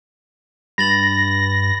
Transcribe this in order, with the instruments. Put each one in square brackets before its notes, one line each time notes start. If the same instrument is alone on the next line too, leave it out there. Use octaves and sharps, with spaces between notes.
[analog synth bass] G2 [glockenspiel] B5 A6 F#7 [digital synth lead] A#6